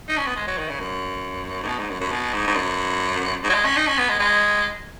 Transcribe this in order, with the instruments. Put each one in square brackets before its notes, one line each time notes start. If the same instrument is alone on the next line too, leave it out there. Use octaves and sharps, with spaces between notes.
[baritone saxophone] D#4
C#4
B3
G#3
F#3
D#3
C#3
F#2
G#2
B2
G#2
F#2
F#2
B2
G#2
G#2
F#2
G#2
F#3
G#3
C#4
D#4
C#4
B3
G#3
G#3